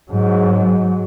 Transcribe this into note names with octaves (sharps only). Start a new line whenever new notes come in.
G#2 F#3